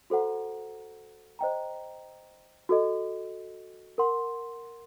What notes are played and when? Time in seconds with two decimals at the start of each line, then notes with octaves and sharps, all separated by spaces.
0.10 F#4 A4 C5 F#5 A#5
1.39 C5 D#5 G5 A#5
2.69 F#4 A4 D#5
3.98 A#4 F#5 C6